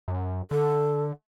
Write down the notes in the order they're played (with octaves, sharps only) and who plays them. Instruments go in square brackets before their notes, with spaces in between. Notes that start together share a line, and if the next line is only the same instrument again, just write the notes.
[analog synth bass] F#2
[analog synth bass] D3 [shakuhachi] A4